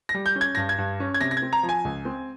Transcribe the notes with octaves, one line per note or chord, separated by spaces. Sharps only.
A#6
G3
G6
C#4
G#6
G2 A#6
G#6
G2
C#4
G#6
C3 A#6
A#6
G#6
C4
A#5
F3
G#5
C#2
C4